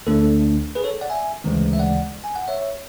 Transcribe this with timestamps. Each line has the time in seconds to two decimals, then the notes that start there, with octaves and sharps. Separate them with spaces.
0.07 D2 D3 A3 D4 A4
0.75 G#4 B4
0.84 A4 C#5
1.01 D5 F#5
1.10 E5 G#5
1.44 D2 C#3 E3 G#3
1.73 E5
1.79 D5 F#5
2.24 G#5
2.35 F#5
2.48 C#5 E5